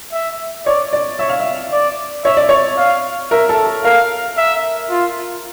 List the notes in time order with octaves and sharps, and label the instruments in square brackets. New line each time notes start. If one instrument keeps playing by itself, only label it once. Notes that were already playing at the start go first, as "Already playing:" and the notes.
[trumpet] E5
[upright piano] C#5 [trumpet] D5
[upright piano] D5
[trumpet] C#5 [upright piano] E5
[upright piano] F5
E5
[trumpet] D5
[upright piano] C#5 [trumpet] E5
[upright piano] D5
C#5
[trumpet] F5
[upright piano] A#4 [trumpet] E5
[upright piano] A4
A4
[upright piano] A#4 [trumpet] F5
[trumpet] E5
F4